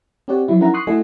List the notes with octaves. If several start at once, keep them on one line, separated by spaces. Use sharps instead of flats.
C4 F#4 G4 C#5 D5 F#5
F3 F#3 E4
C#4 D#4 E4 A#4 F#5 A#5
C6 C#6 D#6 F#6 C7
A3 E4 F#4 D#5 G#5